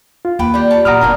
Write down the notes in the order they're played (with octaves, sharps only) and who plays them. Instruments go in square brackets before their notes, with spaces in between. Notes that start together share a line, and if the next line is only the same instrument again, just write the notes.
[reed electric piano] F4
[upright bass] D#2 [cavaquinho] B4 G5 D6
[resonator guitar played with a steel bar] G3 G4
[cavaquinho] C#5 A5
[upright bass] A#2 F#3 [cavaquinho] F#4 D5 B5 [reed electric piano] A#5 D#6 F6
[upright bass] F#1 B1 [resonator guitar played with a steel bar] B2 A#3 D4